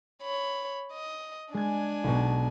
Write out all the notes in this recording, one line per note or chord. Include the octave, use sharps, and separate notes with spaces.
C#5 B5
D#5
G#3 D4 G#5 G#6
B1 B2